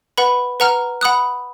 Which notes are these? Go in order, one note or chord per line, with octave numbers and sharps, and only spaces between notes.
B4 F#5 B5
B4 F#5 A#5 F6
F#5 B5 D#6 F#6